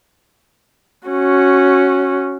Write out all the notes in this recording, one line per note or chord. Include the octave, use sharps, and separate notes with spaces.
C#4 F#4